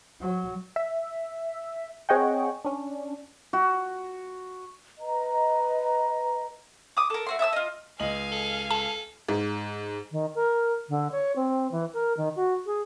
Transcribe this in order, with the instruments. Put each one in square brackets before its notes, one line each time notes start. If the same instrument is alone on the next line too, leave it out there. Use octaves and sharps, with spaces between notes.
[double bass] F#3
[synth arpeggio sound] E5
C4 G#4 C#5 D#5 F#5 G5
C#4 D4
[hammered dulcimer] F#4
[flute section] B4 D#5 A#5
[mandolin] D6 D#6
A4 A#4
A3 F#4 C6
E5 A5 D#6 E6
F4 D#5
[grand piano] C#2 D#5 F#7 [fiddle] F5 G#5
[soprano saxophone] A4
[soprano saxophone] A4 [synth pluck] A5
[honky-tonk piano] G#2
[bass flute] D#3
A#4
D3
C#5
C4
E3
A#4
D#3
F#4
G#4